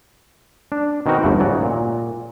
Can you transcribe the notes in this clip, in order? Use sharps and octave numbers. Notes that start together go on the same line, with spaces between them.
D4
B2 D#3 C4 D#4 F#4 A#4
G1 D#2 A2 E3 A3 F#5
G#2 C#3 F#3 D5
A#2